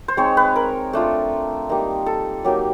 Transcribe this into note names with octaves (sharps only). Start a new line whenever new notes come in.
C5
G#3 C4 D#4 C#5
B4
A#4
A3 D4 F4
G3 A#3 D#4
A4
F#3 A#3 D#4 G4